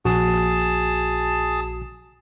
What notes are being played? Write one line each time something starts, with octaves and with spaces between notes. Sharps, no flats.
A#1 F#4 G#4 A5